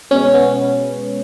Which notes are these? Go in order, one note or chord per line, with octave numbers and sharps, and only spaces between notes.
B2 G#3 C#4
B3